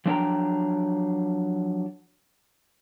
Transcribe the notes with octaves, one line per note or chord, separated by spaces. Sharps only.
F3 F#3 D4 C5 G5 A#5